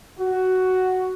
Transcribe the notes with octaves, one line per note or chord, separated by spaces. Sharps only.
F#4